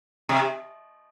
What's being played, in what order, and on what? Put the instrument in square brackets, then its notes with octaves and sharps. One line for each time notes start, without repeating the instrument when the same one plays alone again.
[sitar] C3